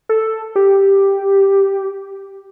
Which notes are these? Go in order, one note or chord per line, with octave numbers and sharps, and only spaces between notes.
A4
G4